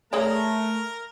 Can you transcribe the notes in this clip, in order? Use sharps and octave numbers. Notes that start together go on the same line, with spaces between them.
A3 G#4 A#4 C#5 D5 A#5